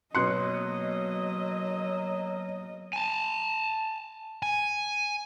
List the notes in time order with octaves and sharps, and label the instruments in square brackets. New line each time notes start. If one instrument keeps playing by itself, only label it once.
[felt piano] B2 F#6 C#7 [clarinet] F#3 [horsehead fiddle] A#3 D#5 [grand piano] C6
[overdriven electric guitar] G#5 A5
G#5